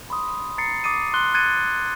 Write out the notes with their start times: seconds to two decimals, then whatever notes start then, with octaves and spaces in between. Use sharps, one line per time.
0.10 B5 C6 D#6
0.58 A#5 A6 C7 C#7
0.84 D6 D#6 A6 C7 D#7
1.14 C6 F#6 G7
1.34 F#6 G#6 A6 C#7 D#7